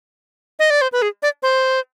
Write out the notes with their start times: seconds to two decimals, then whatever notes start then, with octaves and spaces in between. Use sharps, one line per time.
0.59 D#5
0.70 D5
0.81 C5
0.92 B4
1.02 G#4
1.22 D5
1.42 C5